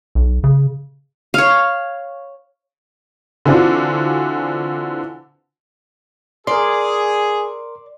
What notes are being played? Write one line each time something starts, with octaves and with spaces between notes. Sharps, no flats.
B1
C#3
C#5 F5
D3 E3 C4 D4 F4 F#4
G#4 A#4 D5 C6